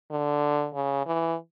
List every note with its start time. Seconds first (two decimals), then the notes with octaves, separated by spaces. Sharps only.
0.11 D3
0.74 C#3
1.06 E3